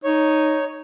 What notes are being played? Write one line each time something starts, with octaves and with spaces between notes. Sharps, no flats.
D#4 C#5